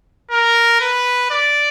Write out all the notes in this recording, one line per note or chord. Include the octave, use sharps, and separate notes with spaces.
A#4
B4
D5